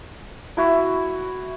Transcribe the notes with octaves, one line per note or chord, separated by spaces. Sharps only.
E4 F#4